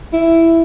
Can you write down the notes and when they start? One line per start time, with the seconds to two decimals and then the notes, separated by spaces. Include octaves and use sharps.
0.13 E4